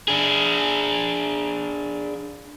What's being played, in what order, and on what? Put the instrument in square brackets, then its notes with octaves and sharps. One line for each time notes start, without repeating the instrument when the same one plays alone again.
[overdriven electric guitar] D4 G#4